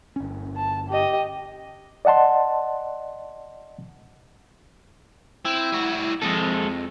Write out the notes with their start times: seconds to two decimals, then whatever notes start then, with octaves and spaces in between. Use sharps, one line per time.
0.16 G1 C#4
0.57 A5
0.89 G4 D#5
2.05 D5 D#5 F#5 A5 C6
5.45 C4 E4
5.72 G3 F#4
6.22 F2 G#3 A4